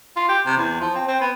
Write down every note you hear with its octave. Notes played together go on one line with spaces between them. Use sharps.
F4
G4
C3
E2
F3
C4
C4
B3